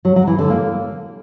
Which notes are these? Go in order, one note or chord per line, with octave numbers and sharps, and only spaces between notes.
F#3
F#3
E3
D3
A#3